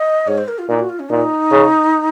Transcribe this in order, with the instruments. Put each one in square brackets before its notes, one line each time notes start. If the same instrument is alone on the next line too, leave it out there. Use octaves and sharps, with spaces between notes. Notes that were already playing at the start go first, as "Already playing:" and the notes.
Already playing: [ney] D#5
[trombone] G#2 [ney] C#5
[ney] C5
A#4
F4
[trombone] A#2 [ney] D#4
[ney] F#4
F4
C#4
[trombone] A#2 [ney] D#4
[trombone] C#3